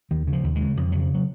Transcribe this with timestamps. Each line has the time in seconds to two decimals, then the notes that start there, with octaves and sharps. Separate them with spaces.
0.11 D#2 D#3
0.27 C#3
0.33 F3
0.44 D#2
0.56 G#3
0.61 C#3
0.77 F2 F3
0.92 C#3 F#3
1.00 F3
1.15 F#3